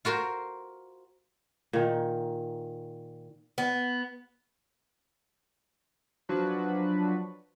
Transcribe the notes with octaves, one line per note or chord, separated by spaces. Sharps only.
F4 F#4 A#4 C5
A#2 D#3
B3
F3 F#3 D4 F#4 B4